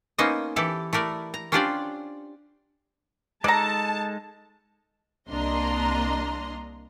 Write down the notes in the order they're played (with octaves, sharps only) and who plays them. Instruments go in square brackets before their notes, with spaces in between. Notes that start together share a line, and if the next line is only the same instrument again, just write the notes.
[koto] A#3 B3 C#4 D#4 C5 D#5
E3 E4 G4 A4 A5
A3 E4 A#4 D5
A#5
C#4 D4 F4 G4 C5 D5
[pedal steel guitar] G#3 D#4 A4 [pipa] D5 A#5 [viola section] A5
[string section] C2 A#3 D4 D#5 A#5 C6